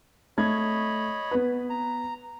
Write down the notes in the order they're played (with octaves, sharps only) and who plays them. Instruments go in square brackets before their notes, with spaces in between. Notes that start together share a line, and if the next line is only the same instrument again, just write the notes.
[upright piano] A3 G#6 [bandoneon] C#5 D#5 B5
[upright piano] B3 B4
[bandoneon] A#5